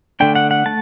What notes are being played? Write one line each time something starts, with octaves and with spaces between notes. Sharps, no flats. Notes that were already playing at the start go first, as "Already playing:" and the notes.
D3 A3 D4 G5
F#5
F#5
A3 A5